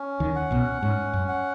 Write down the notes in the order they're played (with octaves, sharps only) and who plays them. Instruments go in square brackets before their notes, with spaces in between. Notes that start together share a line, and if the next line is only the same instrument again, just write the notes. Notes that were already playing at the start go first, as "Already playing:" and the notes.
Already playing: [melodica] C#4
[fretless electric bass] D#2 D#3
[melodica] F#5
[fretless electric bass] B1 B2
[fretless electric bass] G#2 [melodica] C#4
[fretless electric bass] F#2
[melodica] F#5